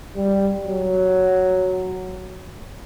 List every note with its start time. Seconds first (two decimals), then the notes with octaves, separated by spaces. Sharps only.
0.16 G3
0.66 F#3